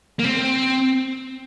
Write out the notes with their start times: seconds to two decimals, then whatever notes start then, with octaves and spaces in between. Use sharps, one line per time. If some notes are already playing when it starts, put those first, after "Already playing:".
0.19 A#3
0.25 C4